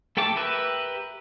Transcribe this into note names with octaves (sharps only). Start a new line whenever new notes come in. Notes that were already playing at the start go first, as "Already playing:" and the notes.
A3 A4 G5 A5 D6
G4 A#4 B4 E5